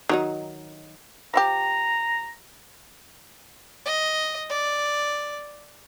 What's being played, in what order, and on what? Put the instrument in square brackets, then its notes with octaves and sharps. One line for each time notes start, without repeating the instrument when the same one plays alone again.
[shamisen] D#3 F#3 D#4
[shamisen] F3 E4 G4 [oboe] A#5
[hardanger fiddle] D#5
D5